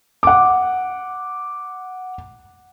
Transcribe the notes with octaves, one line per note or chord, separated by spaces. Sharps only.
F#5 D6